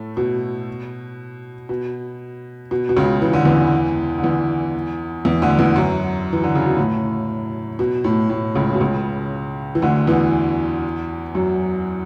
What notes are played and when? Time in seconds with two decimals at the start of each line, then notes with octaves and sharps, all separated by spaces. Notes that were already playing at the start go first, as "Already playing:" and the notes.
Already playing: A2 A3
0.17 B2
1.69 B2
2.71 B2
2.89 B2
2.96 C#2 C#3
3.22 E3
3.33 D3
3.45 E2 E3
4.18 D3
4.23 E2 E3
5.25 E2 E3
5.42 D2 D3
5.59 E2 E3
5.76 F#2 F#3
6.33 E3
6.44 D3
6.55 C#3
6.66 B2
6.77 A2
7.79 B2
8.04 A2
8.30 A2
8.55 C#2 C#3
8.74 B2
8.81 C#2 C#3
9.75 E3
9.82 D2 D3
10.07 E2 E3
11.35 F#2 F#3